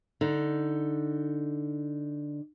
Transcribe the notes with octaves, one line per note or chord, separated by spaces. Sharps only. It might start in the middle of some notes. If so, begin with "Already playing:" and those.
D3 D#4